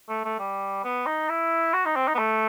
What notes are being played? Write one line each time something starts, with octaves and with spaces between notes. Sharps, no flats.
A3
A3
G3
B3
D#4
E4
F#4
D#4
C4
D#4
B3
A3